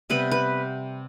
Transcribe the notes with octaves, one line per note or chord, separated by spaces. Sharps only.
C3 G3 B3 B4
B4